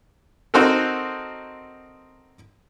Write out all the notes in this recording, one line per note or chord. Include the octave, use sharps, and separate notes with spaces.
C4 D#4 F#4 A4 A#4